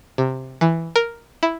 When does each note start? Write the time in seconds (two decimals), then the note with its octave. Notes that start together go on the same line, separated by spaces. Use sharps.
0.18 C3
0.61 E3
0.96 A#4
1.43 E4